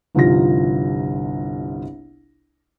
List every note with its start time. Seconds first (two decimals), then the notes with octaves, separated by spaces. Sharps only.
0.15 G1 C2 F3 D#4 F4 A#6